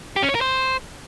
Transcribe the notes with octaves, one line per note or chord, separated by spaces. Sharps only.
G4
C#4
C#5
A#4
C5